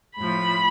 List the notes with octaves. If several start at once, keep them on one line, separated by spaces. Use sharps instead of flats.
A2 F3 B5